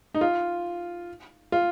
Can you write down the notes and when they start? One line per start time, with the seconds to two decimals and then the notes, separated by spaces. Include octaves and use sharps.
0.14 D#4
0.21 F4
1.52 F4